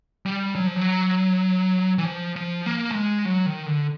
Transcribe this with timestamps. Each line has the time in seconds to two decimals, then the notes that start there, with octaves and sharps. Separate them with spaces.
0.26 G3
0.55 F#3
0.67 F3
0.76 F#3
1.98 E3
2.05 F3
2.36 F3
2.66 A#3
2.91 A3
2.95 G#3
3.25 F#3
3.46 D#3
3.66 D3